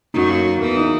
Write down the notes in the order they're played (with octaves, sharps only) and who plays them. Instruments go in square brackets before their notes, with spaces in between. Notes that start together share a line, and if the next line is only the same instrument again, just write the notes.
[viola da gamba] F#2 F#3 [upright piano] D#4
[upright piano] A#3
F#4
[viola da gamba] E2 E3 [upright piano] A#4
[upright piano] D#4